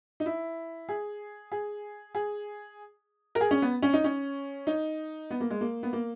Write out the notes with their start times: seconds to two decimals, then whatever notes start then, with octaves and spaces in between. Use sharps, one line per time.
0.20 D#4
0.26 E4
0.89 G#4
1.52 G#4
2.15 G#4
3.35 A#4
3.41 G#4
3.51 C#4
3.62 B3
3.82 C#4
3.93 D#4
4.04 C#4
4.67 D#4
5.31 B3
5.40 A#3
5.50 G#3
5.61 A#3
5.83 B3
5.93 A#3